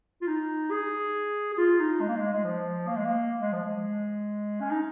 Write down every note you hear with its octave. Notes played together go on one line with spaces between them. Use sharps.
F4
D#4
G#4
G#4
F4
D#4
G#3
A#3
G#3
G#3
F3
A#3
G#3
A#3
G#3
F3
G#3
C#4
D#4